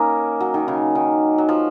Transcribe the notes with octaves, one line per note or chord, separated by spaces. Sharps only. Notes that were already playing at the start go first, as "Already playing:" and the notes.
Already playing: A#3 C#4 D#4
F#3
D#3
C#3
D#3
F#3
F3